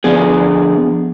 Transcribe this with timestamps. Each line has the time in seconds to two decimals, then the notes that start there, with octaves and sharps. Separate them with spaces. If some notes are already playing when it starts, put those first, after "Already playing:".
0.04 D3 F3 B3 G#4